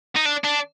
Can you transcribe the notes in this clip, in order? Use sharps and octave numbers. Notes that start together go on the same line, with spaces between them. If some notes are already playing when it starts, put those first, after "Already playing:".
D#4
D4
D4